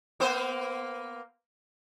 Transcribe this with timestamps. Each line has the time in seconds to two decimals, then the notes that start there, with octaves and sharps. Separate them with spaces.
0.20 A#3 B3 C5